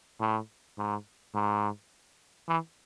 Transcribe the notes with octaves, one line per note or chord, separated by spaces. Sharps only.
A2
G#2
G#2
E3